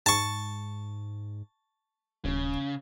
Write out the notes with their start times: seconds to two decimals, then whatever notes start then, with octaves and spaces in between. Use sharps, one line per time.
0.06 G#2 A5 C#6
2.25 D#1 C#3